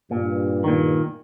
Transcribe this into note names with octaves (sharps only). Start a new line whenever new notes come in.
G2 A#2
A#2 D#3